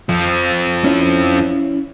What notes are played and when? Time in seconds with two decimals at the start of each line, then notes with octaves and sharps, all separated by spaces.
0.09 F2 F3
0.84 C#4 E4